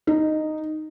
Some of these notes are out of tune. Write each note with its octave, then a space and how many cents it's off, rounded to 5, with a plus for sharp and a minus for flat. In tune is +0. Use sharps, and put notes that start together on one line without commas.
D#4 -10